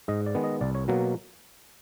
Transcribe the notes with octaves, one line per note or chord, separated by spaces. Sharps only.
G#2 D#5
D5
D#3 G#3 B3
D#5
C2 D5
C#5
B2 F#3 A#3